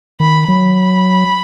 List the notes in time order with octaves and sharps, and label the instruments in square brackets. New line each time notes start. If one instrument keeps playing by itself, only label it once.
[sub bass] D#3 [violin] B5
[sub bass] F#3 [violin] B5